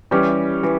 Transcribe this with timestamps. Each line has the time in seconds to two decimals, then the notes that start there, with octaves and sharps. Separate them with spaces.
0.11 E3 G3 C#4 G4
0.63 E3